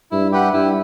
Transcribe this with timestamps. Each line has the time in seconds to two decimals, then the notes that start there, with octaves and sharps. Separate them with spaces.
0.11 G2 E4
0.32 G4 B4 F#5
0.53 G2 E4